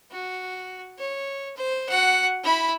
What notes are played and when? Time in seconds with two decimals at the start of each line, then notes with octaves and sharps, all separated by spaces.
0.11 F#4
0.98 C#5
1.56 C5
1.89 F#4 F#5
2.44 E4 B5